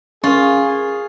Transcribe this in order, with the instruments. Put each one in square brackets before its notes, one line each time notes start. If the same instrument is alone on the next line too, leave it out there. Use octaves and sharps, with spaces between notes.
[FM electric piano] C#4 [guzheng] F4 [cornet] G#4 [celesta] A#4 C6 C#6